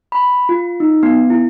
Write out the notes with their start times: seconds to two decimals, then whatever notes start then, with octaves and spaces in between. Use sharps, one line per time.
0.12 B5
0.49 F4
0.80 D#4
1.03 B3
1.30 E4